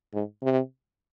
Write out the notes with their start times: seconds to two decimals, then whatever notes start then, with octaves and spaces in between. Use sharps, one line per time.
0.14 G#2
0.42 C3